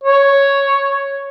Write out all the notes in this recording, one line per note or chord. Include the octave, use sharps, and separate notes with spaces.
C#5